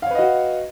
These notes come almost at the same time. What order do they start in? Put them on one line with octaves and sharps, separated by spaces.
F5 C#5 B4 D#5 F#4